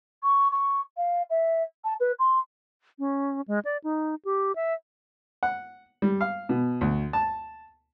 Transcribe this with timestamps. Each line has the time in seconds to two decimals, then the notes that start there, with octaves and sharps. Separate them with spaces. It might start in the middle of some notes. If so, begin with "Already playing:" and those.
0.23 C#6
0.52 C#6
0.97 F5
1.30 E5
1.84 A5
2.00 B4
2.19 C6
2.99 C#4
3.48 G#3
3.65 D5
3.84 D#4
4.25 G4
4.55 E5
5.43 F#5
6.02 G3
6.21 F5
6.49 B2
6.81 D2
7.13 A5